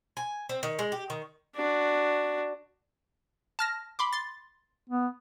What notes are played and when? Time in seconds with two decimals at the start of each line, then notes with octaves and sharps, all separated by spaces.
0.17 G#5
0.49 C4
0.63 D#3
0.79 G#3
0.92 G4
1.10 D#3
1.56 D4 F#4
3.59 A5 F6 A#6
3.99 B5 C6 D6
4.13 C6 A6
4.89 B3